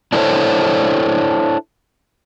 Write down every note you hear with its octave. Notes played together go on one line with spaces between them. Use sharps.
D4 E4 A4 A#4 C5 C#5